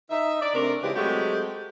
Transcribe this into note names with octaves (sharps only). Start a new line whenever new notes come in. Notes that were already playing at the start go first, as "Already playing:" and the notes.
D#4 E5
D5
C3 A3 C4 D4 A#4
C#3 F3 G#3 E4 G4 B4
F#3 G#3 A3 C4 F#4 G4